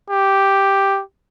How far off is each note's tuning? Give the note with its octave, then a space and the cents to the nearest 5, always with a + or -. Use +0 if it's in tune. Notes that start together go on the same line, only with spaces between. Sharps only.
G4 +0